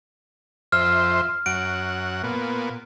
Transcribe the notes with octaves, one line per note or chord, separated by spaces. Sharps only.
F2 C5 E5 F6
F#2 F#5 D7
A#2 B3